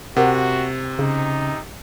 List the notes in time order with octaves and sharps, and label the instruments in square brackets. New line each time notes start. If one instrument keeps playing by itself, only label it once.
[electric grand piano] C3 [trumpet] F#4 [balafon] A#4 F#5
[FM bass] C#3 [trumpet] D#4